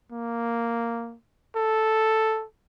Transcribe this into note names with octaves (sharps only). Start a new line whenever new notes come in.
A#3
A4